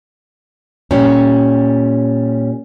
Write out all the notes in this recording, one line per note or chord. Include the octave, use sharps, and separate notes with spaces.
A#2 G3 C#4